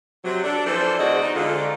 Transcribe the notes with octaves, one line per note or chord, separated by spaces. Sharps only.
C3 F#3
D4 A4
E3 F3 D4 A4 C5
E2 D3 G#3 F#4 D5 D#5
D#4
G#2 D3 F4